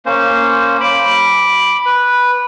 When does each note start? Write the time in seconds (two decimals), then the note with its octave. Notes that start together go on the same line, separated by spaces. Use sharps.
0.06 A#3 C#4 C5
0.80 B5 D6
1.86 B4